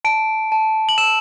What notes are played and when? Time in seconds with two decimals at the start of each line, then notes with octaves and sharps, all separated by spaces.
0.05 A5 D7
0.52 A5
0.89 F#7
0.98 E6 E7